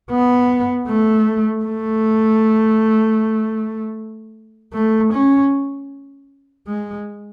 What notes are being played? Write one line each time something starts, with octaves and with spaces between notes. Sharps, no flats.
B3
A3
A3
A3
C#4
G#3